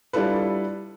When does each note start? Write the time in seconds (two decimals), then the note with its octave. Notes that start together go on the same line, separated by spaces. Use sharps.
0.13 G3 D4 E4 F4 A4 B4